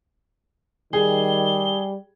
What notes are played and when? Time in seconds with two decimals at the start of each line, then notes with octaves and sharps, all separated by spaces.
0.93 D#3 G3 G#4 G7